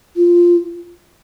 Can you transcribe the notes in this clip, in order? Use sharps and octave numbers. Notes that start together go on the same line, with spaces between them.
F4